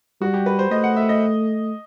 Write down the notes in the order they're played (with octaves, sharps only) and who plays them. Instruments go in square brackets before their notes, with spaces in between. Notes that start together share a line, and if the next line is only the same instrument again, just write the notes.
[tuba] G3 [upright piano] F#4
[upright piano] G4
B4
C5
[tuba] A3 [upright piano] D#5
[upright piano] F#5
E5
D#5